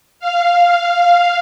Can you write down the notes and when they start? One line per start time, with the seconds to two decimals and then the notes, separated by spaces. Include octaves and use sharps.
0.19 F5